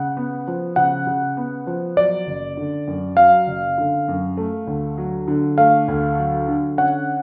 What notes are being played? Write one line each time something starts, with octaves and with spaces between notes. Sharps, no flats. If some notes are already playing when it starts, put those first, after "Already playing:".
Already playing: C#3 F#5
B3
F3
C#3 F#5
C#3
B3
F3
F#3 D5
F#1
D3
F#2
F#3 F5
F#1
D3
F#2
A3
D2
F#3
D3
A3 F5
D2
F#3
D3
C#4 F#5